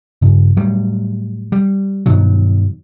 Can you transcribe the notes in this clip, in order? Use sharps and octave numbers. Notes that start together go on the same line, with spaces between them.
G2 C#3
A2 F#3 G3
G3
G2 B2 D#3 F#3